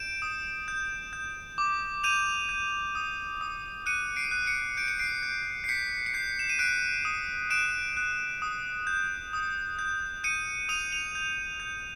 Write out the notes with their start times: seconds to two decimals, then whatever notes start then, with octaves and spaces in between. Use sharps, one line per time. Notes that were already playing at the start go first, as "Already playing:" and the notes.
Already playing: G6 D7 E7
0.22 D#6
0.68 G6
1.13 G6
1.58 D6
2.04 G6 D#7 F7
2.49 G6
2.95 D#6
3.41 D#6
3.86 F#6 C#7 D#7
4.16 C7 D7
4.31 F#6
4.46 C#7 D#7
4.77 G6 D7
4.88 C#7
4.99 C7 D7
5.23 G6
5.64 C7
5.69 G6 B6 C#7
6.06 C#7
6.14 G6 C7
6.39 E7
6.49 D#7
6.59 F#6 C7 D7
7.05 D#6
7.50 F#6 D7 E7
7.97 F#6
8.42 D#6
8.87 G6
9.33 D#6
9.79 G6
10.24 G6 C#7 D#7
10.69 D#6 D#7 F7
10.92 D#7 F7
11.15 G6
11.60 G6